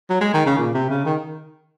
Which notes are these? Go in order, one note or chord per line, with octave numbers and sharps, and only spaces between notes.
F#3
G#3
D#3
C#3
A#2
C3
C#3
D#3